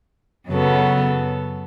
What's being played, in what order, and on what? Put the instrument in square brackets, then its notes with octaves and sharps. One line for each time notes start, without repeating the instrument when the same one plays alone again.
[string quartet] F#2 C#3 F#3 B3 A4